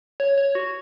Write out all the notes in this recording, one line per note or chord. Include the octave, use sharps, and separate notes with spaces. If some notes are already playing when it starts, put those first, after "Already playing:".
C#5
C#5
F#4